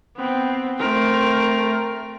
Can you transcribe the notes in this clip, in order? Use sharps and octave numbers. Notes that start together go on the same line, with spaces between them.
B3 C4
A3 C4 A#4